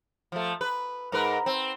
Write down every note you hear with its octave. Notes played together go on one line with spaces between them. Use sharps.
F3 A3
B4
G#2 A#4 B4
C4